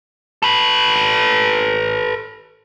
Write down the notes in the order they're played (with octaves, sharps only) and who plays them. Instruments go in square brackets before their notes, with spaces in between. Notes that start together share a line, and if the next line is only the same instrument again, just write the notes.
[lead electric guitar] A4 B4